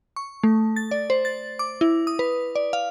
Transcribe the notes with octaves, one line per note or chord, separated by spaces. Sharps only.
C#6
A3
A6
D5
C5
A6
D6
E4
D#6
B4
D5
F5